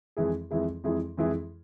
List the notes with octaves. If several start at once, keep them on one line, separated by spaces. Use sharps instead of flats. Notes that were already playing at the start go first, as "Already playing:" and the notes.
F2 E3 G#3 E4 G#4
F2 E3 G#3 E4 G#4
F2 E3 G#3 E4 G#4
F2 E3 G#3 E4 G#4